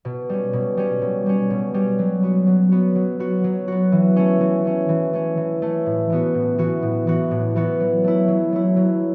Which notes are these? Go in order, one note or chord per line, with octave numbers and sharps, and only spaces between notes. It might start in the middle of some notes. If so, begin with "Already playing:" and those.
B2
G3 C#4
B2
G3 C#4
B2
G3 C#4
B2
G3 C#4
F#3
B3 F#4
F#3
B3 F#4
F#3
B3 F#4
F#3
B3 F#4
E3
A3 C#4
E3
A3 C#4
E3
A3 C#4
E3
A3 C#4
A2
E3 B3 F#4
A2
E3 B3 F#4
A2
E3 B3 F#4
A2
E3 B3 F#4
F#3
A3 E4
F#3
A3 E4
F#3